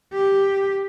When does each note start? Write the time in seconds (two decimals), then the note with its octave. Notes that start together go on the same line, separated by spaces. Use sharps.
0.13 G4